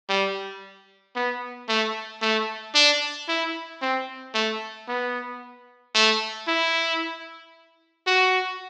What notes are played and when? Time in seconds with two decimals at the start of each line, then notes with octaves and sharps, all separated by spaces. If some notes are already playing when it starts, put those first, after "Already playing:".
0.09 G3
1.16 B3
1.69 A3
2.22 A3
2.75 D4
3.29 E4
3.82 C4
4.35 A3
4.88 B3
5.95 A3
6.48 E4
8.07 F#4